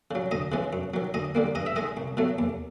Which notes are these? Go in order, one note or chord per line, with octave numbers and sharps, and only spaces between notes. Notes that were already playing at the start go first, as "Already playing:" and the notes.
C#3 F#3
D2 D#5
C#3 E3 G#3
F#2
D#3 F#3
D2 D#5
D3 G3 A#3
G2 D#5
E5
D#3 G#3 D#5
C2
B2 F#3 A3
D#2